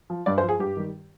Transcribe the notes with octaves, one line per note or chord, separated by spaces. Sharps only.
F3
G2 D5
C5
F3
G#4
G2 G4
D#3 G3